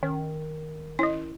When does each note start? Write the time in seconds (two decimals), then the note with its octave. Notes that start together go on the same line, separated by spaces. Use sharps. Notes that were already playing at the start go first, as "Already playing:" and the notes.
0.03 D#3 C#4
0.99 C#4 E4 D#5